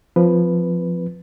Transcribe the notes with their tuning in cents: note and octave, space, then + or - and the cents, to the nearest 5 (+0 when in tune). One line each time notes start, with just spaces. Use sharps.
F3 +0 C4 -15 B4 +0